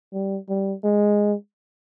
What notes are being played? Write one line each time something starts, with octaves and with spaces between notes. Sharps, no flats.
G3
G3
G#3